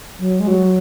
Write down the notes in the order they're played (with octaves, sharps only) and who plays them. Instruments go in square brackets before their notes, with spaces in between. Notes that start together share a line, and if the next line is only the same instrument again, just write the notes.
[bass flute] F#3
G#3
F#3